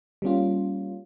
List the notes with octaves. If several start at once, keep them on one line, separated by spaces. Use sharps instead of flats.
G3 A#3 C#4 F4